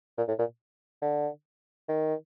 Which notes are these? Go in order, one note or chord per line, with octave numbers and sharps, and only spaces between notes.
A#2
A2
A#2
D3
D#3